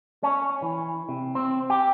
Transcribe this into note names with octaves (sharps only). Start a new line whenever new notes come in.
C#4
E3
C3
C4
G4